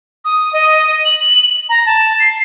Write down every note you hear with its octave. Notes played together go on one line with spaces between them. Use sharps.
D#6
D#5
F#7
A#5
A5
C7